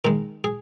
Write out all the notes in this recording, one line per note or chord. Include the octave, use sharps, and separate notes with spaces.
D#3 G#3 A#4
G#4